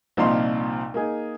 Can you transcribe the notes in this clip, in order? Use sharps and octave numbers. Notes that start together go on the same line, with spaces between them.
C2 A#2 F3 D#4 F5 C6
A#3 D#4 G#4